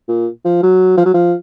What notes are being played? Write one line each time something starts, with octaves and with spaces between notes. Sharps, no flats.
A#2
F3
F#3
F3
F#3
F3